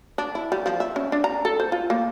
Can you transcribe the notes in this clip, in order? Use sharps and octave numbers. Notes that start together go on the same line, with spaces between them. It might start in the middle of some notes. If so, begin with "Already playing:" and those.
D4
E4
G3
F3
E5
C#4
D4
A#5
A4
C5
F4
A#3